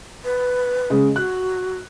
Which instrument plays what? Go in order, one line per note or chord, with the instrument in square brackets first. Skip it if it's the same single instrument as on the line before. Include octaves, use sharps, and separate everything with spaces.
[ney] B4
[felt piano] C#3 G#3
[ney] F#4 [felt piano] F#6